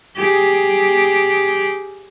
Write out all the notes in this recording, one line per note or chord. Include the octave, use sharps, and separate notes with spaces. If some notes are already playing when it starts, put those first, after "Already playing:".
G4 G#4